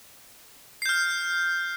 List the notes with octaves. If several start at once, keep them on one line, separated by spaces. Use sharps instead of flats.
F6 G6 C7